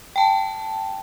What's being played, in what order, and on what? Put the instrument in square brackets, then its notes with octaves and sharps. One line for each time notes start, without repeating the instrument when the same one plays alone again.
[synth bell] G5 A5